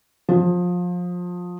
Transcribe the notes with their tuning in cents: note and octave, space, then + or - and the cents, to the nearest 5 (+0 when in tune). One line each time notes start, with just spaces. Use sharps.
F3 +25